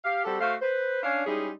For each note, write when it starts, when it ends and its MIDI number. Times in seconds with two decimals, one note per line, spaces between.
0.05 0.23 67
0.05 0.23 77
0.25 0.36 55
0.25 0.36 60
0.25 0.36 66
0.25 0.36 69
0.41 0.54 57
0.41 0.54 66
0.41 0.54 72
0.41 0.54 77
0.61 1.02 71
0.61 1.02 72
1.03 1.25 61
1.03 1.25 62
1.03 1.25 77
1.26 1.50 55
1.26 1.50 56
1.26 1.50 61
1.26 1.50 63
1.26 1.50 64
1.26 1.50 68